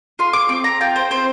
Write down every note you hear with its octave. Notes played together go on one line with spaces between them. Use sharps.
F4 C6
D6
C4 D6
A#5
F4 G5
C5
C4 C5